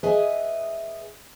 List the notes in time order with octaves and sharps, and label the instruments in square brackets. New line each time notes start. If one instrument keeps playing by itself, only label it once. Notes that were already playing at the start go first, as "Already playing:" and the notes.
[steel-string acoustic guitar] G#4 B4 D#5 E5 G#5